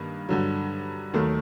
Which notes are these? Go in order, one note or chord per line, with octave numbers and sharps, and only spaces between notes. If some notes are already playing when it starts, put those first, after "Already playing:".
Already playing: G2 D#3 A#3
G2 D3 F#3
D#2 D#3 F#3 A3